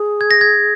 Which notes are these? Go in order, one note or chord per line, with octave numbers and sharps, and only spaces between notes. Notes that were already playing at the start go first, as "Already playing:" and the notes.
Already playing: G#4
G#6
A#6
G#6